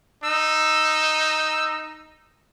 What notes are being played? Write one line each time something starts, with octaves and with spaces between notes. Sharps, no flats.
D#4 E6